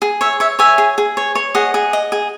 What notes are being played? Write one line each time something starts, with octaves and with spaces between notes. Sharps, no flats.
G#4
C#5 E5
C#5 E5
C#5 E5 G#5
G#4
G#4
C#5
C#5
G#4 D#5 F#5
G#4
D#5
G#4